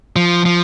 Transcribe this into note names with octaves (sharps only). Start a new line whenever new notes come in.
F3
F3